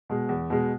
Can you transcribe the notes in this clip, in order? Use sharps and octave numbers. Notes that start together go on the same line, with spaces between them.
B2 G#3
E2
B2 G#3